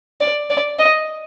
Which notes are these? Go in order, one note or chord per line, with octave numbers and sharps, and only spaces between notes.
D5
D5
D#5